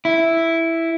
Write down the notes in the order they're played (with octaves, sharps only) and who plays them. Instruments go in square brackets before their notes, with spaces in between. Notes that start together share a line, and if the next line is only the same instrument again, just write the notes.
[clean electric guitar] E4